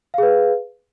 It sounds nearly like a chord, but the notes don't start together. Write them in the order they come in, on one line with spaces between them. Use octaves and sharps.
F5 G#4 B4